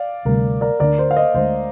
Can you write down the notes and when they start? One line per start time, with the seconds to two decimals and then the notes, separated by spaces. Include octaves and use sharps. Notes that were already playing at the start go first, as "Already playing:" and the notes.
Already playing: D5 F5
0.25 D2 C3 G3 A#4
0.61 A#4 D5
0.80 D2 D3 G#3 D4 A#4 D5
0.99 C5
1.11 F5
1.16 C5 D#5
1.34 D2 D3 G#3 C5